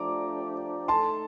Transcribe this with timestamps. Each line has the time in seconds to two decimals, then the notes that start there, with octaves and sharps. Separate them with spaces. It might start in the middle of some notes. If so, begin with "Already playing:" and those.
Already playing: F3 A3 D4 G4 D5 A#5 D6
0.88 A3 D#4 A4 A5 C6